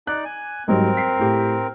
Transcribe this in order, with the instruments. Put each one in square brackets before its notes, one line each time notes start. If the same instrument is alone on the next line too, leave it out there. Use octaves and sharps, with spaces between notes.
[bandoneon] D#4 D5 [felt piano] F#6
[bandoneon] G#5
[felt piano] G#2 F#3 G3 [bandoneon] C4 A#4
[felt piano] B6 C7
A2 G4